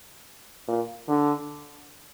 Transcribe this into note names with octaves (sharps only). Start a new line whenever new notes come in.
A#2
D3